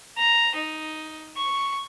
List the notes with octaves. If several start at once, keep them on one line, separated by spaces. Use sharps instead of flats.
A#5
D#4
C#6